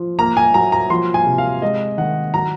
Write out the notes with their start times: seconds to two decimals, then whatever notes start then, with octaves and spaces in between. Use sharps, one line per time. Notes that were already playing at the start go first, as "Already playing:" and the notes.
Already playing: F3
0.19 A#3 A#5
0.37 G#5
0.54 F#3 A#5
0.72 A#5
0.90 F3 C6
1.14 G#5
1.26 C3
1.38 F5
1.62 G#3 D#5
1.98 D#3 F#5
2.34 F#3 A#5